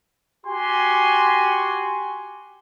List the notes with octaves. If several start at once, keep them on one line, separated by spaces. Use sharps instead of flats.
F#4 G4 G#5 C6